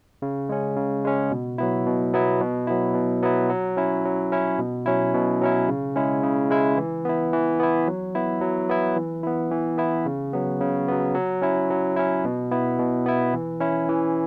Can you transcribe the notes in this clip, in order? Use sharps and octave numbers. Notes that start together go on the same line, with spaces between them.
C#3
G#3 C#4
C#3
G#3 C#4
B2
F#3 B3 E4
B2
F#3 B3 E4
B2
F#3 B3 E4
B2
F#3 B3 E4
F#3
C#4 E4
F#3
C#4 E4
B2
F#3 C#4 E4
B2
F#3 C#4 E4
C#3
G#3 C#4 E4
C#3
G#3 C#4 E4
E3
B3 E4
E3
B3 E4
F#3
B3 E4
F#3
B3 E4
E3
B3 E4
E3
B3 E4
C#3
F#3 B3
C#3
F#3 B3
F#3
C#4 E4
F#3
C#4 E4
B2
B3 E4
B2
B3 E4
E3
C#4 E4
E3